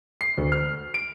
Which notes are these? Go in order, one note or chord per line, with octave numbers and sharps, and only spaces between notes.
C7
D2
F6
D7